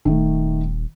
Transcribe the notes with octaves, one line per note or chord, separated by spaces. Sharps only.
D#1 D#3 A3